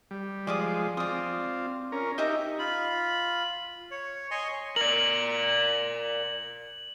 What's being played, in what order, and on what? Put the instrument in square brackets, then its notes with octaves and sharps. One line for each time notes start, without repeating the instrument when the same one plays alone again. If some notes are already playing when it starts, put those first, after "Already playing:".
[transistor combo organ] G3
[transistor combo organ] F3 G#3 [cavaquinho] D5 D6 D#6
[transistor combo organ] C4 F4 [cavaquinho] D5 D#6
[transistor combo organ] C#4 A#4
[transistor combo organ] D#4 G4 [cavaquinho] D#5 E5 A#5
[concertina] F4 B5
C#5
C#5 D#5 G#5 C6 C#6
[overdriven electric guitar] A#4 D5 [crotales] F#7